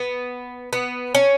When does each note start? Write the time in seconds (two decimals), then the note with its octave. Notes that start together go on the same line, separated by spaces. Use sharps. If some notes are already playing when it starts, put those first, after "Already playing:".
Already playing: B3
0.73 B3
1.15 C#4